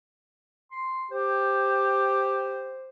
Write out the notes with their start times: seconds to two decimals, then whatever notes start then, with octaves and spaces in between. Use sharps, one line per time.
0.72 C6
1.12 G4 C5